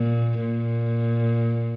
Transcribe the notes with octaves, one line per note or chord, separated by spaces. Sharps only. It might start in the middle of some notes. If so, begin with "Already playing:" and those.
Already playing: A#2
A#2